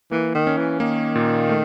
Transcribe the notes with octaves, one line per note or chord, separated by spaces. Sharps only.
E3 A#3
D#3
C#4
E3
D#3 A#3
A#2
A3